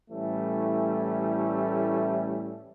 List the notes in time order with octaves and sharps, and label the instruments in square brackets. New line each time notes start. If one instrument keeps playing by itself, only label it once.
[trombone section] A2 E3 G3 A3 C#4